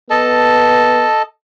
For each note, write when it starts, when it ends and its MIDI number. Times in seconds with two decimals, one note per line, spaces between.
0.10 1.06 59
0.10 1.22 69
0.10 1.22 75
0.10 1.22 81